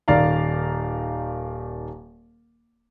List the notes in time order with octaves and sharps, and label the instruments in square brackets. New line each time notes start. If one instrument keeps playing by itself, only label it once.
[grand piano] D#1 D#3 D5 F5 A#5